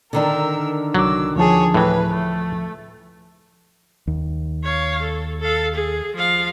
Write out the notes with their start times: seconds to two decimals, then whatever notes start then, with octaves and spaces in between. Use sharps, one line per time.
0.13 D3 D#3 D4 A#4 E6
0.95 C2 F#3 D6 E6
1.36 D2 F3 G#4 C#5 A5
1.74 A2 E3 B4
2.14 A3
4.07 D#2
4.63 C#5 F5
5.02 A4
5.40 A4 F5
5.74 G#4
6.15 F3 F5